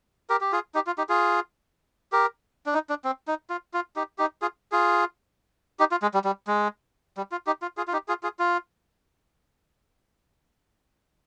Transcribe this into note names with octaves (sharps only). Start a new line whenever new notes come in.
G4 A#4
G4
F4 G#4
D#4 G4
F4
D#4 G4
F4 G#4
G4 A#4
D4
D#4
D4
C4
D#4
F4
F4
D#4 G4
D#4 G4
F4 G#4
F4 G#4
D#4 G4
F4
G#3
G3
G3
G#3
G3
F4
D#4 G4
F4
F4 G#4
F4
D#4 G4
F4 G#4
F4 G#4
F4